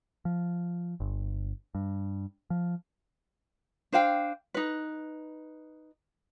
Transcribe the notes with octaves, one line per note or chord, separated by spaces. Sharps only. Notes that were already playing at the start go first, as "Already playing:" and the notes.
F3
G1
G2
F3
D4 C5 F5 G5
D#4 B4